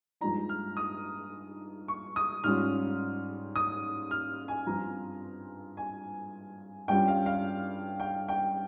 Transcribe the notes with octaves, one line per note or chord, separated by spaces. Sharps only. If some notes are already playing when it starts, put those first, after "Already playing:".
G2 F3 G#3 D#4 A#5
F6
D#6
C#6
D#6
G#2 G3 C#4 F4 F6
D#6
F6
G#5
G2 F3 C4 F4 A#5
G#5
G2 G3 C#4 F4 G5
F5
F5
G5
G5